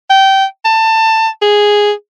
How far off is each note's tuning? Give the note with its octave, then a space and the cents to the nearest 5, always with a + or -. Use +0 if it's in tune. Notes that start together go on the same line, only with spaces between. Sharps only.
G5 -20
A5 +20
G#4 -5